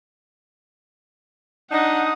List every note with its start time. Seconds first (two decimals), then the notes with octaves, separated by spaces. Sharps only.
1.71 D4 D#4 F#5 D#6